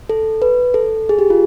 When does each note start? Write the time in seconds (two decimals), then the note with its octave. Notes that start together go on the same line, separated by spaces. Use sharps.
0.09 A4
0.42 B4
0.74 A4
1.09 G#4
1.19 G4
1.30 F4